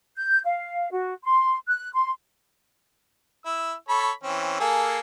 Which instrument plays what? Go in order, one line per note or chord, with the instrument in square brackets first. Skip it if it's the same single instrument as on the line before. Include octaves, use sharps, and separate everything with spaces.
[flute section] G6
F5
F#4
C6
F#6
C6
[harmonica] E4 E6
A4 C#5 B5
E3 C4 C#4
A#3 G#4 A4